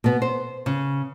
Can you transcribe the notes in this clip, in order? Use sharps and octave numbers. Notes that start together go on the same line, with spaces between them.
B2 B3
C5
C#3